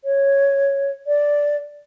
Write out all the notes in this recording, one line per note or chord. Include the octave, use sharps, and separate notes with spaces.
C#5
D5